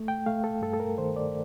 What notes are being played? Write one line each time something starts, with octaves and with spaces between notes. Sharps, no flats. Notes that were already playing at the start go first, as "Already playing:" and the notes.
Already playing: A3
G5
A3 F5
A4
G2 A4
A4
A#4
D#3 C5
D5